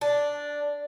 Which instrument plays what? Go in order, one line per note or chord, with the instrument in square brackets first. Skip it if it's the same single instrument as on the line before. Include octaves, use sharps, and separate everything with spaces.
[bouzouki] D4